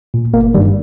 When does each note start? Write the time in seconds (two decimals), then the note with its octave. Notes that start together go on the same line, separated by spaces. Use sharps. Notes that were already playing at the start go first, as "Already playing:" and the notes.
0.14 A#2
0.34 G1 A#3
0.54 D#3 G3
0.57 G2